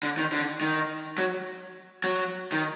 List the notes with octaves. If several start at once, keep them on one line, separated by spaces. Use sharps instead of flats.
D3
D#3
D3
D#3
F#3
F#3
D#3